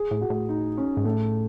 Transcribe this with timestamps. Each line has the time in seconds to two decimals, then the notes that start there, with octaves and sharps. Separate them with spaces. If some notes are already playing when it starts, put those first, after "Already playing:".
Already playing: G#4
0.11 A2
0.21 F#4
0.30 A2
0.49 D#4
0.77 C#4
0.97 G#2
1.05 A2 A3